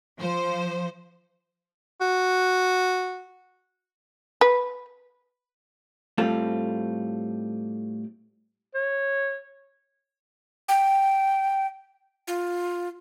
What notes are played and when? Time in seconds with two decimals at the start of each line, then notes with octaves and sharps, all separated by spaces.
0.19 F3 C5
2.01 F#4
4.41 B4
6.18 A2 G3 C4 F4 A4
8.74 C#5
10.69 G5
12.28 F4